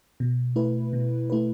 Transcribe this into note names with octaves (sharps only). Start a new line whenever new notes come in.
B2
A3 E4 B4
B2
A3 E4 B4